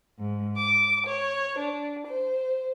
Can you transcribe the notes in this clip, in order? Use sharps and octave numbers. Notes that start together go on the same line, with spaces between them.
G#2
D6
C#5
D4
C5